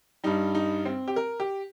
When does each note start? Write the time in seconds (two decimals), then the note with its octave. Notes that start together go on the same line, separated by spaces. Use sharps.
0.24 G2 G3 D#4
0.55 D#4
0.86 C4
1.08 G4
1.16 A#4
1.40 G4